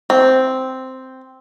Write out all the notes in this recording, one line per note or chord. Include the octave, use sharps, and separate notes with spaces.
C4